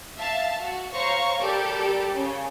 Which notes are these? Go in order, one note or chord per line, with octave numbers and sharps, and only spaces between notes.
E5 F5 A5
F#4
C5 C#5 F5 A#5 C#6
G3 G4 A4 A#4 D5
C#3